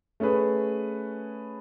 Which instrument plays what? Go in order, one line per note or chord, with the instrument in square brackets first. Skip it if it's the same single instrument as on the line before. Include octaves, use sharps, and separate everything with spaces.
[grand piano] A3 C#4 G#4 B4